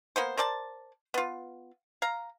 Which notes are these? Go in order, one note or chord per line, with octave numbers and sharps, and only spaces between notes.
A#3 B3 C5
A#4 C5 D5 A5
B3 F4
F5 A#5